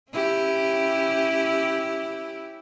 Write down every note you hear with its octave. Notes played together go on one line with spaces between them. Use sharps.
C#4 E4 G4